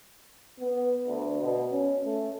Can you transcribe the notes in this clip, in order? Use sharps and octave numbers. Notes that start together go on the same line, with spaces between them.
B3
D2
B2
C#4
A3